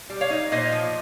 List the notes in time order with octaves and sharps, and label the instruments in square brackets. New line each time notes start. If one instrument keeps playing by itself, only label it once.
[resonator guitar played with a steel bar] G3
C#5 F5
D#4
A#2 C5 D#5
F3